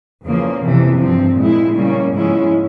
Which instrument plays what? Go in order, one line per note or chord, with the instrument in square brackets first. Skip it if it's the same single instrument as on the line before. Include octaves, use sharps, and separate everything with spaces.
[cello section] E2 C#3 F3 A#3
F2 C3 E3
G2 F3 C4
A#2 G#3 E4
C#3 G3 A#3 C#4
G#2 F3 G#3 C#4 E4